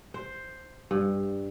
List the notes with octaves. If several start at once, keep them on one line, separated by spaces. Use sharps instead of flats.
C5
G2